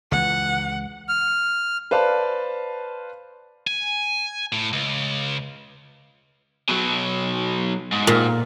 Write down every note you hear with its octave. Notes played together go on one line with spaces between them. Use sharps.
C#2 E3 F#5
F6
B4 C5 D5 F5 A5
G#5
A2
C#2
B2 F#3
G#2
A#2